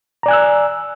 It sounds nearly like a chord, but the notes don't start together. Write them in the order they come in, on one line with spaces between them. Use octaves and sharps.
A#5 D5 G#5 F#6 E6